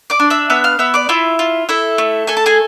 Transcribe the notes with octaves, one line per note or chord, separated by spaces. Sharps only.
D5 D6
D4
E5 E6
B3 E5 E6
F5 F6
B3 E5 E6
D5 D6
E4 F4 E5
F4
E4 A4 E5
A3
A4 G#5
A5
G#4 G#5